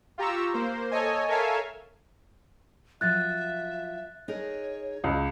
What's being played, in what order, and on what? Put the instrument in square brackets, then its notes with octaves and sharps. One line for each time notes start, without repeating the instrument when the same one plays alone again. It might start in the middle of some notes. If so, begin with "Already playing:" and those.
[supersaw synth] F4 G4 A#5 C#6 E6
A#3 C5
A4 C#5 D#5 G#5
A4 A#4 C#5 E5 F5 G#5
[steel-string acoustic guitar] F3 F#3 F4 [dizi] E5 [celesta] F#6 A6
[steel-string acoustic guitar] D#4 G#4 A#4 [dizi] C#5
[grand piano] C#2